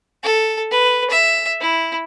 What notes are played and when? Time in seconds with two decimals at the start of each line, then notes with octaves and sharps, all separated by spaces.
0.23 A4
0.71 B4
1.10 E5
1.61 E4